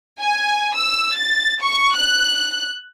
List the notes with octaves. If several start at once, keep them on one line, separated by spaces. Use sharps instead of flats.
G#5
E6
A6
C#6
F#6